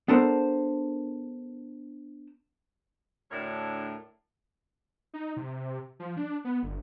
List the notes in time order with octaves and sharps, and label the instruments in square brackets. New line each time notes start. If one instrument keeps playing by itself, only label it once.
[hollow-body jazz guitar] B3 D4 A4 A#4 C5
[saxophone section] D2 A2 D4 A#4 C#5
[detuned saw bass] D#4
C3
F3
D4
B3
G1